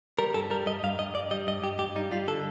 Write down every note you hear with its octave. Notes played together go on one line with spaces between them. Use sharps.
G3 A#4
G2 A4
G3 A#4
G2 D#5
G2 F5
G2 D#5
G2 D5
G3 D#5
G2 D#5
G2 G4
G2 G4
G3 D#4
G3 F4
D3 A4